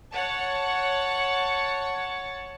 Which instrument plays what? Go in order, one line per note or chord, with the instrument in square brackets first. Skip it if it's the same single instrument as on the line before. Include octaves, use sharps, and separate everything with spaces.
[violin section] C#5 F#5 A5